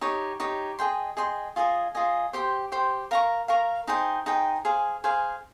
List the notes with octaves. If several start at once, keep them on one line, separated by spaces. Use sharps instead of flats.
D#4 G4 C#5
D#4 G4 C#5
G#4 D#5 G5 C6
G#4 D#5 G5 C6
F4 G#4 D#5 G#5
F4 G#4 D#5 G#5
G4 C5 G5 C6
G4 C5 G5 C6
A#4 F5 A#5 C#6
A#4 F5 A#5 C#6
D#4 G#4 C5 G5
D#4 G#4 C5 G5
G#4 C5 F5 G#5
G#4 C5 F5 G#5